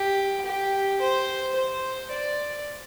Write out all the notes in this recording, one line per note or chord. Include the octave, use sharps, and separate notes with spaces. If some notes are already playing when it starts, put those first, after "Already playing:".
Already playing: G4
G4
C5
C5
D5